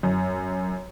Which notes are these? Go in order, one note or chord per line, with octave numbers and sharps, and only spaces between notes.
F#2